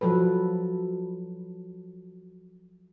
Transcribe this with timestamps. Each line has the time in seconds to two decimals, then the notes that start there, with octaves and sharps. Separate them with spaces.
0.01 F3 F#3 A4 B4